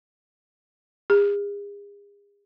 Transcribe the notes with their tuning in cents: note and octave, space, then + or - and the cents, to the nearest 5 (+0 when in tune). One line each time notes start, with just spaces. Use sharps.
G#4 -40